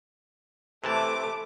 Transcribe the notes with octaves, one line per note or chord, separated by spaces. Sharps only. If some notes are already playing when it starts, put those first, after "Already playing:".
C3 E3 A3 A5 D6